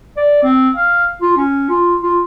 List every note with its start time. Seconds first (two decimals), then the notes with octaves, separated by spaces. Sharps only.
0.17 D5
0.44 C4
0.77 F5
1.22 F4
1.37 C#4
1.70 F4
2.03 F4